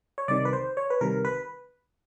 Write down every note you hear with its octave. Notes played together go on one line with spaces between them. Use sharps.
C#5
C2 C3 D#3 D5
B4
C5
C#5
B4
C2 C3 D#3 A#4
B4